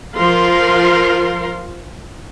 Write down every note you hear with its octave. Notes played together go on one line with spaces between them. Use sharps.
F3 F4 A#4 F5 C6